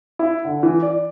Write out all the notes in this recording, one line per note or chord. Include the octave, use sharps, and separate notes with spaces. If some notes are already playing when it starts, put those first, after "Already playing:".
E4
D3
E3
D5